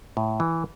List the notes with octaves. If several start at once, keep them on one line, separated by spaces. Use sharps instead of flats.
A2
E3